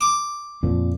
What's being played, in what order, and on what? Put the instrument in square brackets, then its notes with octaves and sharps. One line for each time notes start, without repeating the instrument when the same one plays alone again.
[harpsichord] D6
[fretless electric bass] F2 A#2 F3